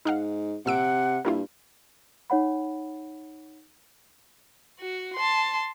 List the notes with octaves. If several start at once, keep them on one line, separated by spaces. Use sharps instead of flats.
G#2 D#4 F5 F#5
A#1 C3 F#5 E6 D7
G2 A#3 E4 F4
D#4 C#5 F#5 B5
F#4
A5 C6